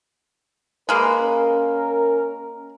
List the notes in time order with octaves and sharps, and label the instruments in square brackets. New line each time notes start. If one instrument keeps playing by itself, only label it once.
[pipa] G#3 A#3 [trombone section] B4
[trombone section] C#4 A#4